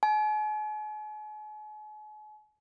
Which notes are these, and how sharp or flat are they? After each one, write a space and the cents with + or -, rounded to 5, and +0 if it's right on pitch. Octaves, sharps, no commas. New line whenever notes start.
G#5 +40